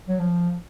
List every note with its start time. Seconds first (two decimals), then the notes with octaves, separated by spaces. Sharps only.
0.08 F#3
0.19 F3